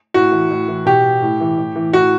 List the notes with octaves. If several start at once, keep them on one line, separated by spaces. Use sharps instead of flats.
A2 F#4
E3
A2
E3
B2 G4
A2
E3
A2
E3
A2 F#4